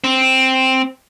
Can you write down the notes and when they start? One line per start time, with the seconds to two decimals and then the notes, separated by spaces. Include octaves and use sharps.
0.04 C4